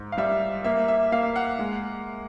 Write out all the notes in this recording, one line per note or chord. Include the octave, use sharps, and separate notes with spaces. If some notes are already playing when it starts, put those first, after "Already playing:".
Already playing: G#2
F5
G3 E5
A#3 E5
E5
A#3 F5
F#5
G#3